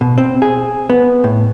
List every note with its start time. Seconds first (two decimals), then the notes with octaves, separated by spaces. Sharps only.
0.01 B2
0.18 C4
0.42 G#4
0.90 B3
1.24 A2